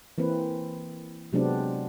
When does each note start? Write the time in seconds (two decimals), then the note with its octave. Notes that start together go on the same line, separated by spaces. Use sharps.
0.18 E3 A#3 C4 B4
1.33 C3 F#3 G#3 B3 C4 D4